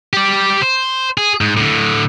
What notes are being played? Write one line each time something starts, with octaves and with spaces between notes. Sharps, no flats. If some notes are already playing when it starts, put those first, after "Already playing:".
G4 D5
C5
G#4
G#2
A2 D3